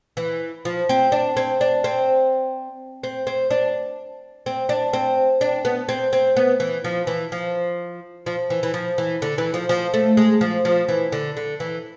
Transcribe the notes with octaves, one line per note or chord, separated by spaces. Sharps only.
E3
F3
C4
D4
C4
D4
C4
C4
C4
D4
C4
D4
C4
D4
B3
C4
C4
B3
E3
F3
E3
F3
F3
E3
E3
F3
E3
D3
E3
F3
F3
A3
G#3
F3
F3
E3
D3
D3
E3